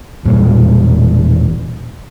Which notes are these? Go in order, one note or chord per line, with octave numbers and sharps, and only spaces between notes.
E1 A#2 G3